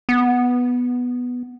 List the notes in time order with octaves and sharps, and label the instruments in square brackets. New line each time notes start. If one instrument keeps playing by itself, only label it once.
[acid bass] B3